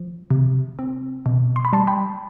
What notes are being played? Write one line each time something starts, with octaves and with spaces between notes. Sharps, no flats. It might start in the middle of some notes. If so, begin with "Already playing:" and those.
Already playing: F3
C3
C4
B2
C6
B5
G3 A5 C6
G5 B5